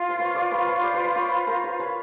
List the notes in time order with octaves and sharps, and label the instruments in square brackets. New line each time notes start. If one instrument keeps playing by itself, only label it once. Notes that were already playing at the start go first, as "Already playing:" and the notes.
Already playing: [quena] F4
[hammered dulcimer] C5
B4 C#5
C5 D5
B4 C#5
B4 C#5
C5 D5
B4
C5
B4 C#5
A#4 C5
B4 C#5
B4 C#5